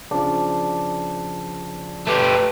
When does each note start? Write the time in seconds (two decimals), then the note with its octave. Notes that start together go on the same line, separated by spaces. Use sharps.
0.11 C#3 F3 D4
2.07 A3 G4 B4